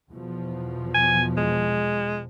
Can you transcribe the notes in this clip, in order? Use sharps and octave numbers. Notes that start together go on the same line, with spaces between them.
E2 B2 F3
G#5
G#3